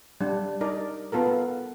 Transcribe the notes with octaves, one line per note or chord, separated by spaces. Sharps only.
G3 D4
D#4 A#4 D5
B3 F4 A4 A#4